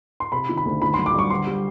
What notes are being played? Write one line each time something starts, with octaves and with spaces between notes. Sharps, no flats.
C6
C3 B5
D#3
B5
D2
D#3 B5
F#3 C6
D6
G2 C#6
D3 C6
G3